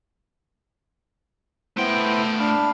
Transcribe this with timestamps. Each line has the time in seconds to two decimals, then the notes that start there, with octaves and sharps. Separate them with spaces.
1.77 A3 B3 E4 C5 G5
2.39 D4 F5 B5